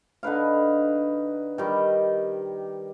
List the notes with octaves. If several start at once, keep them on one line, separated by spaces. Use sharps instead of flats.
D3 D#4 B4 F5
D#3 G3